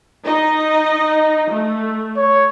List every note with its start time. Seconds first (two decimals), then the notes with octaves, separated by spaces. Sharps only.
0.24 D#4 D#5
1.50 A3
2.17 C#5